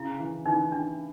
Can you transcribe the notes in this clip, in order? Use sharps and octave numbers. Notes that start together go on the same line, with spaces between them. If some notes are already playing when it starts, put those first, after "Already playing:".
Already playing: C#3 E4
E3
E3 D#4
E3 D4